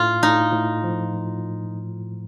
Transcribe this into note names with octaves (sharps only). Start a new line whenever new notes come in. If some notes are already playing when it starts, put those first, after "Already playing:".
Already playing: A2 F4
A2 D#4
A2
F3